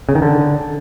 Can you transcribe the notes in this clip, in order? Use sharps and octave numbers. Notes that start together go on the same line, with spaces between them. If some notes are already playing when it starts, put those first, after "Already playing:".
C#3
D#3
D3